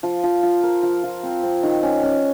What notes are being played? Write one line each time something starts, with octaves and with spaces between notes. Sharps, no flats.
F3
F3
F4
A#4
F3
F3
C4
C4
D#3
C#4
C#4